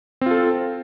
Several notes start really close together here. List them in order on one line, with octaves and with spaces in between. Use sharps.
C4 F4 A4